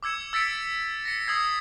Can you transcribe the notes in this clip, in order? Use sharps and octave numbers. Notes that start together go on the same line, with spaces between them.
D6 E6 G#6 C#7 E7
E6 A6 B6 C#7 D7
A#6 C#7
D#6 E6 G#6 C7